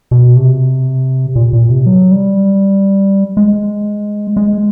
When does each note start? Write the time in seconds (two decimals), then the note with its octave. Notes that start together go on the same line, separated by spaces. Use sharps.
0.11 B2
0.36 C3
1.36 A#2
1.53 A#2
1.70 C3
1.86 F#3
2.11 G3
3.37 G#3
4.37 G#3